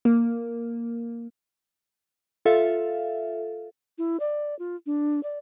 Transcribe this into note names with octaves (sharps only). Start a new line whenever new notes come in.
A#3
F4 A4 E5 F5
E4
D5
F4
D4
D5